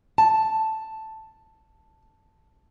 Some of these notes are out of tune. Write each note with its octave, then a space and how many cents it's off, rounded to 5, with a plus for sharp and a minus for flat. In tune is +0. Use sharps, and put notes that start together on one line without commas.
A5 +0